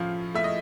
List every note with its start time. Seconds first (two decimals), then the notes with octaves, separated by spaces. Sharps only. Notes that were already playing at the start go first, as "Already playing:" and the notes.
Already playing: A2 F3 C#4 F5
0.34 A3 E5
0.44 D#5